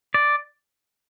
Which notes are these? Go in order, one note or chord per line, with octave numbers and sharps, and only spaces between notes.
D5